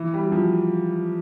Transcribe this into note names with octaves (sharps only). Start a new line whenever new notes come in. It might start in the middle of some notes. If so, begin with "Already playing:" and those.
Already playing: E3
G3
F#3
F3